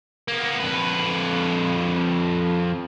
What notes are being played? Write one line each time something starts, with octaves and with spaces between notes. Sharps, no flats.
A#3 B3
F2 B4